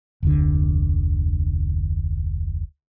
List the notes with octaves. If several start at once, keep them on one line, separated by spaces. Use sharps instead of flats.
F1 D2 D3